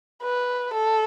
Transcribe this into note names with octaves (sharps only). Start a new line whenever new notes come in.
B4
A4